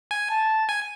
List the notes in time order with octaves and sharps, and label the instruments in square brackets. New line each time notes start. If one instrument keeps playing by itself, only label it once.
[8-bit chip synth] G#5
[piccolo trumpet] A5
[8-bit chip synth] G#5